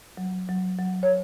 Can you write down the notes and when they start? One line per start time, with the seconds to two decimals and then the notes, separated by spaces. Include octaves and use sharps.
0.17 F#3
0.49 F#3
0.79 F#3
1.03 C#5